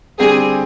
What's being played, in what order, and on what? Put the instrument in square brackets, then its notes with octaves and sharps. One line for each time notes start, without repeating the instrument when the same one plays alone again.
[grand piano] D3 G3 C4 G4 [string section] G#4